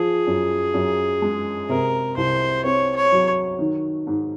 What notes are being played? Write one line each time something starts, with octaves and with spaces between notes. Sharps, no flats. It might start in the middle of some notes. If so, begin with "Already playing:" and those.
Already playing: F3 G#4
F#2
F#2
G#3
C3 A#4
C2 C5
C4 C#5
C#5
F#3
D#3
G#2